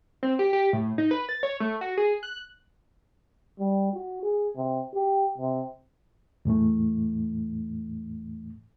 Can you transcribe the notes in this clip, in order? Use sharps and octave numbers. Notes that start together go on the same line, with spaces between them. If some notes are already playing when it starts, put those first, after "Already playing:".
C4
G4
G4
A2
D#4
B4
A6
C#5
A3
F#4
G#4
F#6
G3
F#4
G#4
C3
G4
C3
E2 A2 E3 A3